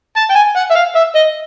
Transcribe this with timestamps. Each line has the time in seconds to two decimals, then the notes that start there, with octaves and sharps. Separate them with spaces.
0.16 A5
0.30 G5
0.35 G#5
0.56 F#5
0.71 E5
0.76 F5
0.95 E5
1.15 D#5